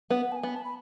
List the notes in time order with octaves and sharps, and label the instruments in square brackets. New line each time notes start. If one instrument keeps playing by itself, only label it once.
[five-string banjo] B3 [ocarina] F#5
[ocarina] A5
G#5
[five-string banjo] B3
[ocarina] A5
B5